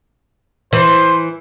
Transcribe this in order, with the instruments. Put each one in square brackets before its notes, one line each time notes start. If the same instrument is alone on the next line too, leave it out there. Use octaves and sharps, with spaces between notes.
[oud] E3 [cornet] C5